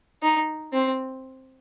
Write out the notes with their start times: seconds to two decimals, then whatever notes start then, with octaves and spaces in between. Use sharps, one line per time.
0.22 D#4
0.73 C4